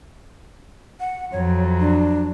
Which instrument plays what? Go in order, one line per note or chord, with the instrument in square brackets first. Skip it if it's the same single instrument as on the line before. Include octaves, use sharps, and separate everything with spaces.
[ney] F#5
[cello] F2 F#3 [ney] C#5
[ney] D4